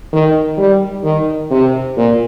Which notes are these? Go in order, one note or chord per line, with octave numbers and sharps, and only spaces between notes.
D#3
G3
D#3
C3
A#2